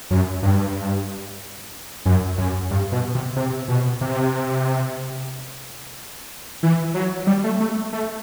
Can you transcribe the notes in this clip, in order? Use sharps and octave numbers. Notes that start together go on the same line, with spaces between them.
F#2
G2
F#2
F#2
G2
B2
C3
C3
B2
C3
E3
F#3
G3
A3
A3
A3